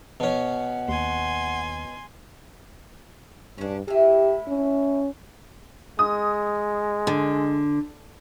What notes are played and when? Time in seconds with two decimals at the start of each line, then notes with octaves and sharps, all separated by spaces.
0.20 B2 C#4 F#5
0.88 D#2 G#5 C6
3.58 G2 C#4 D4
3.88 A2 E4 G4
4.48 C#4
5.99 G#3 D#6
7.07 D3